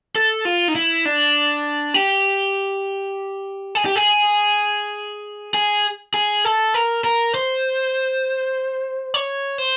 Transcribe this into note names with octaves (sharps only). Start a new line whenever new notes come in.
A4
F4
D#4
E4
D4
G4
G#4
G4
G#4
G#4
G#4
A4
A#4
A#4
C5
C#5
C5